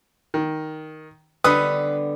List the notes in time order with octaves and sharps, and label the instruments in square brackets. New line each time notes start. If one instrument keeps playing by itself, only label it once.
[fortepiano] D#3
[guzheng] D3 G3 B3 [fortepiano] B4 D#6